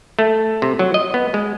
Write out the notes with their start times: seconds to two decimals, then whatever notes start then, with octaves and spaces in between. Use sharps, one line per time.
0.19 A3
0.62 C3
0.79 F#3
0.94 D#5
1.14 B3
1.34 G#3